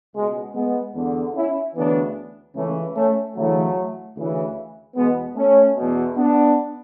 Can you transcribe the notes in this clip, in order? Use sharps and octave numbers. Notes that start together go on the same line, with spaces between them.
C#2 B2 G#3
G#3 B3
E2 D3
C#4 E4
D2 C#3 E3 B3 D4
C#2 C#3 E3 A3 C#4
A3 C#4
D2 C#3 E3 F#3 A3
D2 C#3 E3
E2 B2 G#3 B3
A3 C#4
E2 B2
B3 D4